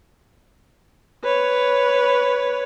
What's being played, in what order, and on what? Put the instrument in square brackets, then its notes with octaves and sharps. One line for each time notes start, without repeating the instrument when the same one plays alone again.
[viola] B4 C#5